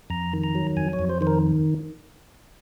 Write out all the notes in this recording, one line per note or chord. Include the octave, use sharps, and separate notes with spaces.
F2 A#5
D#3
A#5
F#3
F2 G#5
C#5
F2
C5
D#3 C5
A#4